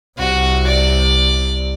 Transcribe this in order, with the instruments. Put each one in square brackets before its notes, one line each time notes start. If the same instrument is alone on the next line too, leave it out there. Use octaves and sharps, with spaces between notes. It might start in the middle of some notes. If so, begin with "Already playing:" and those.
[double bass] C2 [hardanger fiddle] F#4
[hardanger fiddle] D5